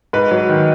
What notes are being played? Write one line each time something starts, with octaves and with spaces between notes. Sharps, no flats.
G#2 B4
F#3
D#3